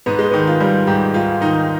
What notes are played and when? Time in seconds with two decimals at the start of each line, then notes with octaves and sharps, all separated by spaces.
0.06 G#2 B3
0.19 G#3
0.31 D#3 B3
0.47 F4
0.60 G3
0.87 G#2 G4
1.14 G#2 F4
1.41 D#3 D#4